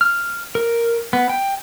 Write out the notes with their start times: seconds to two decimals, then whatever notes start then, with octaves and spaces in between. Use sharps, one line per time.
0.01 F6
0.55 A#4
1.13 B3
1.29 G5